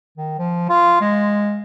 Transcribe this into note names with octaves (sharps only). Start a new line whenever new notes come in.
D#3
F3
F4
G#3